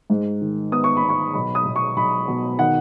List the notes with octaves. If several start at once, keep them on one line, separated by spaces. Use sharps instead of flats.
G#2
D#3
B3 D#6
C#6
B5
B3
C#6
B1 B5
D#6
B1
C#6
B1 B5
B2
D#3 F#5